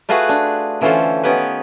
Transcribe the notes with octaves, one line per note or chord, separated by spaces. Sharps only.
A3 F4 F#4 G#4 B4 F#5
D4
D3 E3 C#4 F4 A4 C5
D#3 B3 C#4 G4 B4